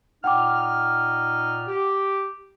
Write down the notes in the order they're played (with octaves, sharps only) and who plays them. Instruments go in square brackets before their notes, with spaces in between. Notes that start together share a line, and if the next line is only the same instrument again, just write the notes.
[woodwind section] A#2 D#4 F6 [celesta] F#5 G5 D6
[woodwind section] G4